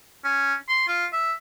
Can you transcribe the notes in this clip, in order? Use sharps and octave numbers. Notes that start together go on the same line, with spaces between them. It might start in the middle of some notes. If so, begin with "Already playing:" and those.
C#4
C6
F4
E5